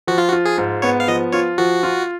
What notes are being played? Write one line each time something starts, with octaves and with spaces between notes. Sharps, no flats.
F3 F#4
F4
F#4
F4
G#4
G#2
B3 C#5
F5
F3 D#5
F4 C#5
F3 F#4
F4